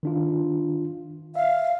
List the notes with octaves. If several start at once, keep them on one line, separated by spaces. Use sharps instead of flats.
D#3 D4 F4
E5 F5